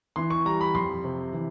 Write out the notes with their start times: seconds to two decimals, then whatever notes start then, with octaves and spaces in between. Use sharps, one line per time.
0.16 E3 C6
0.30 C#6
0.45 G3 A#5
0.61 B5
0.74 F2 C6
1.04 C3
1.33 E3